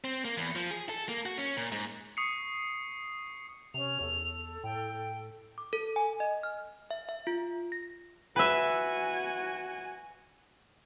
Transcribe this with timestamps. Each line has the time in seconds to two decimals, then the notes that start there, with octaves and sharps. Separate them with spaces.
0.04 C4
0.25 A#3
0.37 E2
0.56 F3
0.71 G#4
0.89 A4
1.09 A#3
1.26 F#4
1.37 C#4
1.57 A#2
1.72 G#2
2.17 C#6 D#6 C7 C#7
3.74 C3 C#4 F7
4.01 E2 A4
4.64 A2 G5
5.58 D6
5.73 A4
5.96 G#5
6.20 D#5
6.43 F6
6.91 E5
7.09 E5
7.27 F4
7.72 A#6
8.36 F#4 B4 E5 G#5